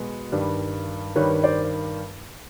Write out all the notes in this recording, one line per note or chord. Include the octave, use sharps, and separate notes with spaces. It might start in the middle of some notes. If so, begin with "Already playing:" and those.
Already playing: B2 G#3 B3
G2 D#3 G3
G2 D#3 G3 B4 C#5
C5 D5